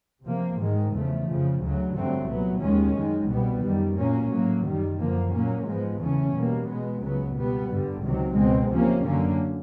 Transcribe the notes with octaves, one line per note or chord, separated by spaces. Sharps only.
C3 F3 A#3
G#2 D#3 G#3
E2 C#3 F3 A3
F2 C#3 F3
D2 C#3 F#3
G2 D3 F#3 A3 C4
C2 A#2 F#3 B3
D#2 D#3 G#3 C#4
F#2 D#3 G#3
C2 B2 G3 B3
F#2 D#3 G3
A#2 F#3 A#3 C#4
A2 F#3 A#3
F#2 D#3 G3
F#2 D3 F3 A#3
A#2 F#3 A#3 C#4
G#2 F3 G#3 B3
E2 C#3 E3 A3 C#4
B2 G3 A#3
B2 G#3 B3
C#2 C#3 F#3 B3
B2 G3 B3
G2 D3 G3
C#2 C3 D#3 F#3
C#2 B2 G#3 C4
D2 C3 F3 A#3 C#4
F#2 D3 F#3 A#3 C#4